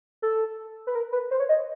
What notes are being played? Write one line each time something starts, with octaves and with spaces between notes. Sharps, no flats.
A4
B4
A#4
B4
C5
C#5
D#5